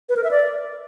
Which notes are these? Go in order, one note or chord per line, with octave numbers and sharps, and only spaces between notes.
B4
A#4
E5
D5